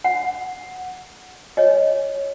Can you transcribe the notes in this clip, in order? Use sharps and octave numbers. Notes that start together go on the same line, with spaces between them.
F#5
C#5 D#5